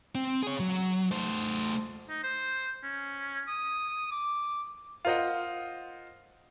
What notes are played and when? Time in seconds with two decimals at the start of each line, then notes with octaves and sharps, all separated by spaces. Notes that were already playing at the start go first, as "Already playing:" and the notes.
0.15 C4
0.43 G#4 C#5
0.60 F#3
1.11 A3 C5
2.09 D#4
2.23 C5
2.83 C#4
3.48 D#6
4.11 D6
5.05 F4 A#4 C5 D#5 F#5